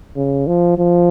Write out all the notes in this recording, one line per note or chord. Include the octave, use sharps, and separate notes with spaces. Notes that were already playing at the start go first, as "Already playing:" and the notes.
C#3
F3
F3